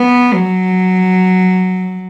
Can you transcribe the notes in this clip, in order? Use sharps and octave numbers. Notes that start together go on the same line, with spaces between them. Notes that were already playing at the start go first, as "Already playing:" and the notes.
Already playing: B3
F#3